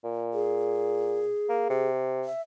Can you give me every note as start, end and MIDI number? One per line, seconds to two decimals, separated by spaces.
0.05 1.29 46
0.34 1.89 68
1.49 1.68 58
1.70 2.27 48
2.24 2.42 76